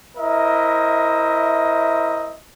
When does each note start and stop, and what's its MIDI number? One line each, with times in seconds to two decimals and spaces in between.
0.18 2.35 64
0.18 2.35 70
0.18 2.35 72
0.18 2.35 75
0.18 2.35 76